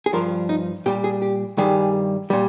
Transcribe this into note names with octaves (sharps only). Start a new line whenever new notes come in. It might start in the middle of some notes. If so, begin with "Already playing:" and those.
G#4
G2 F3 A#4
D#4
A#2 G3 G4
G#4
G4
G2 D#3 G3 G#4
A#2 G3